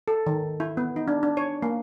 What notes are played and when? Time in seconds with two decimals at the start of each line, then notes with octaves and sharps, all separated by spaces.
0.08 A4
0.26 D#3
0.60 E4
0.77 B3
0.96 D#4
1.08 D4
1.23 D4
1.37 C#5
1.62 A#3